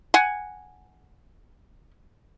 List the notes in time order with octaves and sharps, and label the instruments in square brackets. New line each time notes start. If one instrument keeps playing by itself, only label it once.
[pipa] F#5 G#5